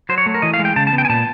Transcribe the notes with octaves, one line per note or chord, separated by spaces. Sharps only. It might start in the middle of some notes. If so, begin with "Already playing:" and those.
F#3 C5
C#5
A3
A#4
E3 D#5
F5
G#3
G5
C#3 A5
A5
B3
G5
G#5
A#2 A5